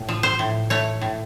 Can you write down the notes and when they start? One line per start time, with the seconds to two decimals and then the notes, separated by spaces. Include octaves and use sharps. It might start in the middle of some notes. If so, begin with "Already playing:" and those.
Already playing: A2
0.09 F3
0.23 C5
0.39 A2
0.70 A3 C#5
1.01 A2